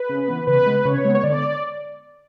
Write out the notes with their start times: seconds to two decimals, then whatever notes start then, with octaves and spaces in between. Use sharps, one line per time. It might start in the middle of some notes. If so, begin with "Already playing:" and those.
Already playing: B4
0.09 C#3
0.28 E3 B3
0.47 C#3 B4
0.66 G#3 B3
0.85 C#3 C#5
1.04 G#3 B3
1.15 C#5
1.23 D3 D5